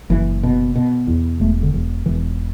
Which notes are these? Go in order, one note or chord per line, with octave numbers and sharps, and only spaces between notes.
F#1 E3
B2
B2
E2
E1 A3
D3
E1 E3
E1 E3